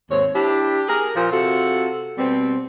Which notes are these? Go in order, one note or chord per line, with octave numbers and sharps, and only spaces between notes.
D#2 G#2 C4 C#5
D4 E4 G4
G#4 A#4
A#2 F3 F4 A#4 C5
C3 F4 F#4 A4
B2 G3 C4